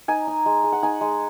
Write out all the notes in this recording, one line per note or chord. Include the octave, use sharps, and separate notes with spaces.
D#4 G#5
D#4
G#3
G#3
F#5
D#4 G#5
G#3